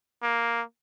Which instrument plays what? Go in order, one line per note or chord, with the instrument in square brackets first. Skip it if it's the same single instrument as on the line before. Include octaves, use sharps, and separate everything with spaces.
[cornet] A#3